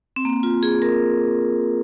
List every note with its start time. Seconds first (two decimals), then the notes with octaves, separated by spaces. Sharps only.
0.16 C4
0.25 A#3
0.43 F4
0.63 G#4
0.82 A#4